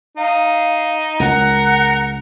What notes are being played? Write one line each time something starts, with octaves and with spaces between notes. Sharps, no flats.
D#4 F5
C#2 A#4 F#5